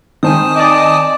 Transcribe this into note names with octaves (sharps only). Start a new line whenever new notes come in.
D#3 C4 G#5 A5 D#6
D5 D#5